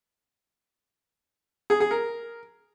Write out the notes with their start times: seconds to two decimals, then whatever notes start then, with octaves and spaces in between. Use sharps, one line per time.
1.70 G#4
1.80 G#4
1.91 A#4